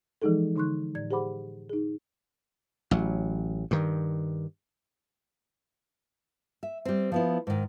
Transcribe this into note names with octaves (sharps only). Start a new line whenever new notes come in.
E3 F3 G#3 D#4 G#4 A4
D3 D#4 C6 C#6 F#6
A2 D5 G#6
G4 G#4 C5 F#5 B5 D6
D#4 G#4
A1 F#3
G2 D#3
E5
G3 C4
F3 B3 E4
G#2 D#3